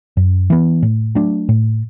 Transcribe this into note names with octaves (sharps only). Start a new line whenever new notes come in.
F#2
E3 B3
A2
F#3 A3 D4
A2